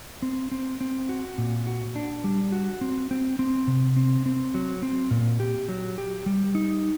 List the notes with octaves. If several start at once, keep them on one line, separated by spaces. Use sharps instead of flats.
C4
C4
C4
F#4
A#2
F#4
D4
G3
F#4
C4
C4
C4
C3
C4
C4
F#3
C4
A#2
G4
F#3
G4
G3
D#4